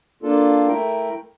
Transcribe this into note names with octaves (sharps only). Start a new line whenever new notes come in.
A#3 D4 F4 A4
A3 E4 A#4 G5